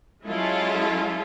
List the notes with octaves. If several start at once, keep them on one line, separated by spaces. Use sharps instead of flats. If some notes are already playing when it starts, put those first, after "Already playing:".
F#3 G#3 C#4 E4 F4 A4